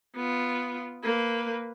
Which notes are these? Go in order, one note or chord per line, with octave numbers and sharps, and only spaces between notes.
B3 F4
A#3 B4